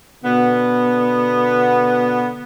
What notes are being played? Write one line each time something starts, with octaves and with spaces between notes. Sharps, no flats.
B2 D3 B3